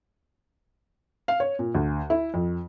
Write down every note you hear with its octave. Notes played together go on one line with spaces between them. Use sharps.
F5
C#5
A#2
D2
E4
F2